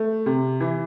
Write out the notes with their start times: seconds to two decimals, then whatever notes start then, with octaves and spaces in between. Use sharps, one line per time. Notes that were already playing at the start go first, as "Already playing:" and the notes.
Already playing: A3
0.26 C3
0.60 E3